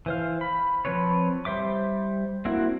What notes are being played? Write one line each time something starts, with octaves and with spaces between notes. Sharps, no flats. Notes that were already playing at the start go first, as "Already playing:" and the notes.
E3 C5 F5
B5
F3 C4 B4 C#5
G3 C5 E5 D6
A#3 C4 D4 E4 F#4